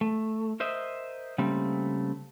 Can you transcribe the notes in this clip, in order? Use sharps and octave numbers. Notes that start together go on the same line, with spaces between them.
A3
A#4 C5 D#5 E5
C#3 G3 A3 A#3 C4